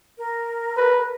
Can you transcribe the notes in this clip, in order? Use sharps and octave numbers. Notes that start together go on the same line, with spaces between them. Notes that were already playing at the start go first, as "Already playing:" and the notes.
A#4
B4